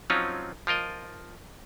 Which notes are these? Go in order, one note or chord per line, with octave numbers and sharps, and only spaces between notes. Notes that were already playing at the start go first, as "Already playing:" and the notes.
F3 F#3 C4 C#4 D#4 F4
F3 F4 A#4 D#5